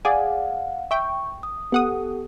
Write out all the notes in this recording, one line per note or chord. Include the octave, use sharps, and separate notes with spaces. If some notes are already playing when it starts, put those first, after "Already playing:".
G#4 D5 F5 F#5 G#5
E5 G5 C#6
D#6
B3 G4 A4 F#5 D#6